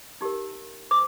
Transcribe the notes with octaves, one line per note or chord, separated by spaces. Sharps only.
D#4 G4 A#4
C5 D6